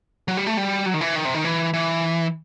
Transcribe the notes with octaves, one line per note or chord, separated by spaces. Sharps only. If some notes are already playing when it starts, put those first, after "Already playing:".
F#3
G3
A3
G3
F#3
D#3
E3
D#3
C3
D#3
E3
E3